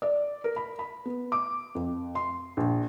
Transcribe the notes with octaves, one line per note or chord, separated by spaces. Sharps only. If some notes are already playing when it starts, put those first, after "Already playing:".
D5
A#4
B5
B5
B3
D6
F2
C6
A#1